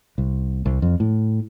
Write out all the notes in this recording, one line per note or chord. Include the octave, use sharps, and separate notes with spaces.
C2
C2
F2
A2